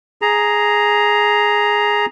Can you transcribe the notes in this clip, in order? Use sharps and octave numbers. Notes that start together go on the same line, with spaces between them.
G#4 A#5